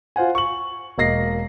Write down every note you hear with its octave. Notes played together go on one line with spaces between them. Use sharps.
F4 C5 F#5 G#5
C#6 F#7
E1 A#3 D#5 A#6 C7